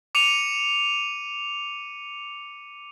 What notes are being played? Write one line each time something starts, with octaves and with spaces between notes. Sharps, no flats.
D6 C#7 D#7 F7